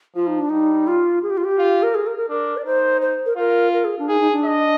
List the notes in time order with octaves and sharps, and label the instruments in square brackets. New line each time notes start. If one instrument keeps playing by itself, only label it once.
[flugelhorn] F3 [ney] F4
[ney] D#4
D4
[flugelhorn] G3 [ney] D#4
[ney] F4
G#4
G4
F4
G4
[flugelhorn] F4
[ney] A#4
G#4
A#4
A#4
[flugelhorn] D4 [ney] A#4
[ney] D5
[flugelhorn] D#4 [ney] C5
[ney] C5
A#4
[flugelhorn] F4 [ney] A#4
[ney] A#4
G#4
D4
[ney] D#4 [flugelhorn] G#4
[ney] D#4
D4
[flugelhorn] D#5